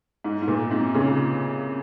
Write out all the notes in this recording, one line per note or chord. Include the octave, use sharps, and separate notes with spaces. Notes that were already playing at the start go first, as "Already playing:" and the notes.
G#2
G#2
A#2
G#2 C3
A#2 C#3